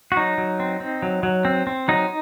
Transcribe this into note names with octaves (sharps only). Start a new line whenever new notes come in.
F#4
F#3 D#4
F#3
C4
C4
F#3
F#3
C4
C4
F#3 D#4